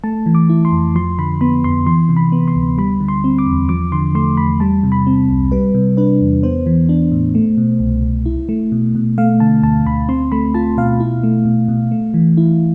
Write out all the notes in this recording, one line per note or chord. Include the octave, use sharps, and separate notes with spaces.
A3 A5
E3
D6
E4
C6
F2
F3 C6
D3 B5
B3 B5
F2 C6
E3 C6
C3
B5
B3
C6
D2
G3 B5
D3
C6
C4
D6
E2
F3 D6
D3 C6
A3 C6
E2 B5
G3 A5
C3
B5
C4
C2
G3 B4
C3
D4 B4
E2
B3 C5
E3
D4
A2
A3
B2
C2
C2
E4
A3
B2
B2
A3 F5
D3 A5
D2 A5
D2 B5
C4 C6
A3 B5
F4 A5
B2 F5
E4
A3
B2
B2
A3
E3
E4